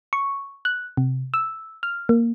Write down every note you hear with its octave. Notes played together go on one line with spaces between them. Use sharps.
C#6
F#6
C3
E6
F6
A#3